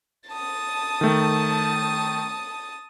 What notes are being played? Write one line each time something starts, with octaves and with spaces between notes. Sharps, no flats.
A5 D#6
D#3 A3